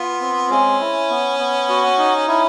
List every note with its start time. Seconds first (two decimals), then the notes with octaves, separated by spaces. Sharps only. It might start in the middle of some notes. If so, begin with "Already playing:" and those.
Already playing: B3 F4
0.21 C4
0.50 G#3 C#4
0.80 E4
1.10 B3
1.39 B3
1.69 F#4
1.98 D#4
2.28 C#4 E4